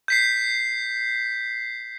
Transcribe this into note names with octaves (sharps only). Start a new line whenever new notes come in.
G6 B6 C7